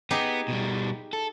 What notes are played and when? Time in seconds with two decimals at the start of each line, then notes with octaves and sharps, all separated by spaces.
0.11 B3 D#4 G4 G#4
0.48 B2 G3
1.13 A4